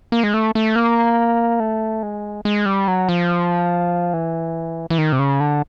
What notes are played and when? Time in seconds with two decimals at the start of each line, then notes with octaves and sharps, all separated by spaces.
0.12 A#3
0.23 G#3
0.34 A3
0.55 A3
0.76 A#3
1.60 A3
2.03 G#3
2.45 G#3
2.66 G3
2.88 F#3
3.09 F3
4.13 E3
4.90 E3
4.98 D#3
5.12 C3
5.19 C#3
5.40 D3